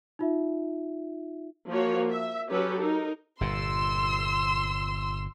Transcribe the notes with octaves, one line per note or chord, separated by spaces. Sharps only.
D#4 F4 E5
F3 A#3 F#4 C#5
E5
F#3 C#4 F#4 G4 A4 B4
D#4 A#4
G1 A#2 C6 E6